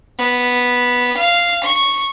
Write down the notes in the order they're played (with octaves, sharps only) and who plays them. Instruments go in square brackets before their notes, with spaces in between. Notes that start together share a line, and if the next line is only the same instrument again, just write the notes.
[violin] B3
F5
C#6